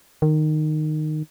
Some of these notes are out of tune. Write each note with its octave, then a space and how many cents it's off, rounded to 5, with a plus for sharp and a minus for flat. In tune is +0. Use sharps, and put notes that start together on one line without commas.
D#3 -15